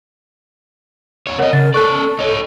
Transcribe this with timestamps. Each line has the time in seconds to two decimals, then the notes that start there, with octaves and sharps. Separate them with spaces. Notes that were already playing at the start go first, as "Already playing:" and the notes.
1.27 E2 C#5
1.39 C3 A#4 C#5 D#5 F#5
1.53 C#3 A#4 A6
1.74 C#4 A4 D5 C#6 F#6
2.19 D#4 C#5